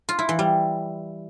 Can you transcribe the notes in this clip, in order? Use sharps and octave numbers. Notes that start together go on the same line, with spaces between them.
F4
E4
E3
G3